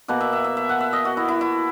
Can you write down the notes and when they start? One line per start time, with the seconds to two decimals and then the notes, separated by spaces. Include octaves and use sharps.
0.08 B2 A#3 F#5
0.21 E5
0.33 E5
0.44 E5
0.57 E5
0.69 F#5
0.81 E5
0.93 D#5
1.05 F#4
1.17 E4
1.28 E4
1.41 E4